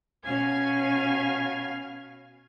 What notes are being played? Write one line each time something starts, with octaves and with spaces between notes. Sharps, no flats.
B2 C#4 F5 G#5 F6 G#6